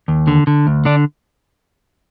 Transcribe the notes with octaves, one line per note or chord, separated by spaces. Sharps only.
D#2
D3
D3
D2
D3 D4